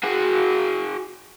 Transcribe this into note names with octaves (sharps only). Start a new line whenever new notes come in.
F#4 G#4